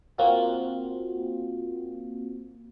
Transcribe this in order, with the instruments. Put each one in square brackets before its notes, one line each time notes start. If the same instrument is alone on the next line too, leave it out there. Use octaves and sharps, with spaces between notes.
[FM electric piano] A#3 C4 F4 F#4